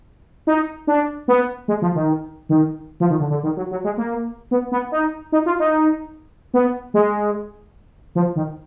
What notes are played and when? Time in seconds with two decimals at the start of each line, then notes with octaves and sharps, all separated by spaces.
0.47 D#4
0.87 D4
1.28 B3
1.68 G#3
1.82 F3
1.95 D#3
2.49 D#3
3.00 F3
3.10 D#3
3.20 D3
3.30 D3
3.43 D#3
3.57 F#3
3.71 F#3
3.84 G#3
3.98 A#3
4.51 B3
4.72 B3
4.92 D#4
5.32 D#4
5.46 F4
5.60 D#4
6.54 B3
6.94 G#3
8.15 F3
8.36 D#3